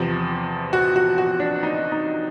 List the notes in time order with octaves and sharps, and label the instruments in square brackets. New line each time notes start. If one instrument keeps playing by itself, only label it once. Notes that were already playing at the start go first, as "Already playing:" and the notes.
Already playing: [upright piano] E2 C3 F3
F#4
F#4
F#4
D4
D#4
D#4